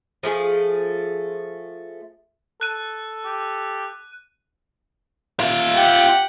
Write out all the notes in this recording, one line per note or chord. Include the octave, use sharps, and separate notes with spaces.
F3 A3 G#4
A4 F#6 D#7
G4
F4 E5
G4 F#5 G5